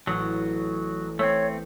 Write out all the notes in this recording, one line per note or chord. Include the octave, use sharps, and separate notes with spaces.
A1 F#3
A3 C4 C#5